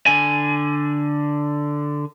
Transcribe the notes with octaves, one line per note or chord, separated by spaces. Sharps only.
D3 G#5